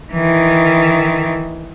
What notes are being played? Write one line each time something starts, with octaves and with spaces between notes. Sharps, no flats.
D#3 E3